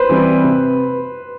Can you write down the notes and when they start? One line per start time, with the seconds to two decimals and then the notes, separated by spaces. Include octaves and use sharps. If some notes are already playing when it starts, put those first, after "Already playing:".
Already playing: B4 C5
0.09 E3 G3 C4
0.44 C3